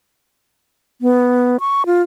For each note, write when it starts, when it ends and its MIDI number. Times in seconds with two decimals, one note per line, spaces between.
1.01 1.57 59
1.60 1.86 85
1.86 2.02 65